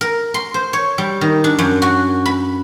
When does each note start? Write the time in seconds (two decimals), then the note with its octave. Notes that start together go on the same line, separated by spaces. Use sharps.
0.01 A#4
0.34 C6
0.54 C5
0.73 C#5
0.98 G3
1.21 D#3
1.44 D4
1.59 F#2
1.82 F#4
2.26 B5